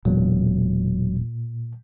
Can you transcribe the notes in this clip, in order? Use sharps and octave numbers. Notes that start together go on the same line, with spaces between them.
E1 A#2 F#3